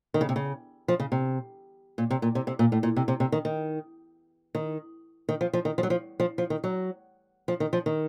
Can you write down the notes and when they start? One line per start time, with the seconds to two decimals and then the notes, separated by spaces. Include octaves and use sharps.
0.14 D#3
0.21 C#3
0.29 C3
0.36 C#3
0.88 F3
1.00 C#3
1.12 C3
1.98 A#2
2.11 C3
2.22 A#2
2.35 C3
2.47 C3
2.59 A#2
2.72 A2
2.83 A#2
2.96 C3
3.08 C3
3.20 C3
3.32 D#3
3.45 D#3
4.55 D#3
5.29 D#3
5.41 F3
5.53 F3
5.65 D#3
5.78 F3
5.83 F#3
5.90 F3
6.20 F3
6.38 F3
6.50 D#3
6.64 F#3
7.48 F3
7.60 D#3
7.73 F3
7.86 D#3